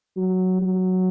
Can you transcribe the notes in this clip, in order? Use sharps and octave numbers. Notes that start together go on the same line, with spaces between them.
F#3
F#3